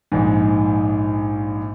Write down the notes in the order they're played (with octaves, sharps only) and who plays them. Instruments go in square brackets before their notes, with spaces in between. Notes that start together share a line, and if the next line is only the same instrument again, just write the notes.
[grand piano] A#1 G#2